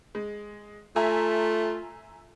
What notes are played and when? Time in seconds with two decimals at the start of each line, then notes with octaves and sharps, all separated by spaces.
0.15 G#3
0.96 A3 F4 E5 G#5 A#5